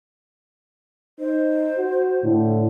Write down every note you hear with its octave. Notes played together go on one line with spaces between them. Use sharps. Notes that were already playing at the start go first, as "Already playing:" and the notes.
D#4 C5
F#4
A2 D3